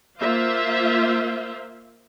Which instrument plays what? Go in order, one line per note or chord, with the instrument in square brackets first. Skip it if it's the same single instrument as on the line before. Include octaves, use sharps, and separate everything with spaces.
[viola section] A#3 F4 C5 E5 F5